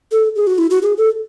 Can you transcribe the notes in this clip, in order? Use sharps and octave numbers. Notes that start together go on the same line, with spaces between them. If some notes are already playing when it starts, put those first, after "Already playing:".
A4
G#4
F#4
E4
F#4
G#4
A4